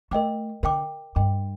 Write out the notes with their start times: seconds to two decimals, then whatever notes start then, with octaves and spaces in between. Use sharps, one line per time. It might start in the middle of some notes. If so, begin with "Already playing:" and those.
0.11 A3 A#4 D#5 G5 D6
0.63 D3 A#4 D#5 G5 D6
1.15 G2 A#4 D#5 G5 D6